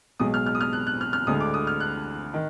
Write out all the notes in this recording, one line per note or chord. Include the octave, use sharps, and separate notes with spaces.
B1 B2 G#3 D#6
F6
F6
D#6
F6
F#6
F#6
F6
F6
D2 D3 G#3 D#6
D6
D#6
F6
F#6
D#3